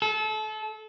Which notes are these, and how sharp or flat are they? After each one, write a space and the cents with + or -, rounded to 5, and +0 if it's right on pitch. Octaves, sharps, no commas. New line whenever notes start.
A4 -30